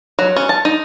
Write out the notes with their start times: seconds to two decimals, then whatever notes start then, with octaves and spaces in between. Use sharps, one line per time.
0.19 F#3
0.37 C#4
0.49 A5
0.65 D#4